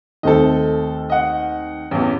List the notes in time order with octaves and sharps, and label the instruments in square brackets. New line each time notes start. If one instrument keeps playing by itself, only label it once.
[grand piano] D#2 A3 C4 [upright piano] A4 D#5
[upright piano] D#5 F#5
A1 E2